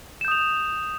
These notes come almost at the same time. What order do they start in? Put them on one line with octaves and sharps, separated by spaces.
E7 G6 D#6 F7